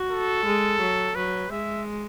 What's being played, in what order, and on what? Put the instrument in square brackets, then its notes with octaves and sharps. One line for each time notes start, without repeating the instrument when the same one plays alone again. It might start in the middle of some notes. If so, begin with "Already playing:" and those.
Already playing: [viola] F#4
[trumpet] A4
[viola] G#3
F#3
[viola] F#3 [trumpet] B4
[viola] G#3 [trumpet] E5